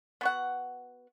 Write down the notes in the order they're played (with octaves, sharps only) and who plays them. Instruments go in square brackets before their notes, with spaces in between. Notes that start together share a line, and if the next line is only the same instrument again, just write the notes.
[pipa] B3 F#4 F#5